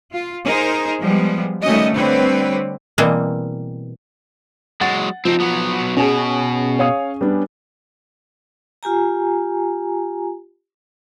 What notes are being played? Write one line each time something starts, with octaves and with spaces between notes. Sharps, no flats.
F4
D#4 G#4 A#4 C5
F3 G3 G#3 B3
D#3 G3 A3 C#4 F#4 D#5
D3 G3 C4 B4 C#5
B2 E3 G3 A#3 C4 G#4
F#3 G#3 F#5 A6
F3 C4 D#4
F#3 B3
B2 C#4 G#4
C#5 F5 D#6
G3 B3 D4
F4 G4 G#5 A#5